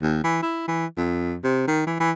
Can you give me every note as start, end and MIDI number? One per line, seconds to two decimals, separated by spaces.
0.02 0.20 39
0.24 0.42 52
0.43 0.63 64
0.67 0.86 52
0.97 1.36 41
1.44 1.67 48
1.68 1.82 51
1.87 1.97 52
2.00 2.11 52